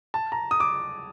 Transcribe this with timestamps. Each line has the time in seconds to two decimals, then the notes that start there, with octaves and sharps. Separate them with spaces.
0.14 A5
0.32 A#5
0.51 D#6
0.60 D6